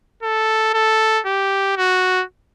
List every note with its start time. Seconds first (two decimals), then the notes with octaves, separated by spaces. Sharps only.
0.23 A4
0.74 A4
1.26 G4
1.77 F#4